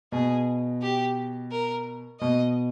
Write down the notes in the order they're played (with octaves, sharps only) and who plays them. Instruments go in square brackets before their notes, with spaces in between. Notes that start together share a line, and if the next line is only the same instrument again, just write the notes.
[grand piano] B2 [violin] G#4
[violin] G4
A#4
[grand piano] B2 [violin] D#5